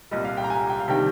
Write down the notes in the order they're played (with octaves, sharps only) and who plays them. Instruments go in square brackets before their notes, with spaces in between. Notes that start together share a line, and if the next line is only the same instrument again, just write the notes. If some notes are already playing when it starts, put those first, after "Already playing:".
[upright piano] C2 A#2 G3 [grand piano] D#5
[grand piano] F5
G5
A#5
G#5
G5
F5
[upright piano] C3 D#3 G3 [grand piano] G5